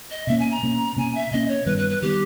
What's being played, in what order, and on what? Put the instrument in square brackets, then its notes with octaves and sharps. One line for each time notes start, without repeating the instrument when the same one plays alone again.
[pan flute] D#5
[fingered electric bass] B2 A#3 C#4 [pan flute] E5
[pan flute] G#5
A#5
[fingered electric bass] B2 A#3 C#4
[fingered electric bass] B2 A#3 C#4 [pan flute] G#5
[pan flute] E5
[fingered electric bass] B2 A#3 C#4 [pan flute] D#5
[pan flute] C#5
[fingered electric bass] G2 D#3 G3 B3 [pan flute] B4
[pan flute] B4
B4
[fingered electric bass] D#3 G3 B3 [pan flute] G4